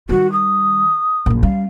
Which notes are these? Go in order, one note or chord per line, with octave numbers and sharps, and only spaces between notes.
D#3 G3 F#4
D#6
A#1 F#2
G3 C#4 F5